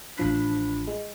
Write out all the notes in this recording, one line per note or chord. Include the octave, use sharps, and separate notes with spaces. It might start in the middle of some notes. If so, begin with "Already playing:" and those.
A1 F3 D4 B5
G#3